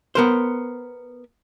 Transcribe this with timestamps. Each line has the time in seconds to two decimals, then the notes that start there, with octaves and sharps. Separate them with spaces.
0.15 B3 A#4 C5